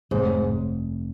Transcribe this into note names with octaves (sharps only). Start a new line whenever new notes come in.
F1 G#2